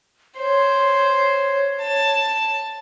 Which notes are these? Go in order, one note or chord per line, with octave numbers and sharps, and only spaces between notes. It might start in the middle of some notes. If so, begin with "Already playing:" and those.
C5 C#5
A5